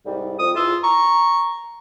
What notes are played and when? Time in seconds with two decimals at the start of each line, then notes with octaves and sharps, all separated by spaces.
0.06 C2 G#2 G3
0.39 F2 D#6
0.56 E2 F4 E6
0.84 A#5 C#6